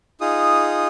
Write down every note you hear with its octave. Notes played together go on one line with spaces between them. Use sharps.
D#4 F4 G#4 D#6